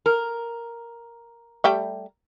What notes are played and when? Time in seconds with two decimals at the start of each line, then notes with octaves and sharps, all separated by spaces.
0.06 A#4
1.64 G3 A3 G5